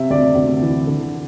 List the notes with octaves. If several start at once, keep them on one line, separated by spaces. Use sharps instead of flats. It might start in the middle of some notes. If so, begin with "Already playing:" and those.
Already playing: C3 E5
D2 D5
D2
E3
D3